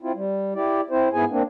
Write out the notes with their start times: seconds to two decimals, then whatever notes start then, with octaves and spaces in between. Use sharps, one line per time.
0.02 C4 E4 F4
0.14 G3
0.55 E4 G4 D5
0.90 C4 E4 C5
1.13 G#2 B3 E4 G#4 G#5
1.30 A#3 C4 D4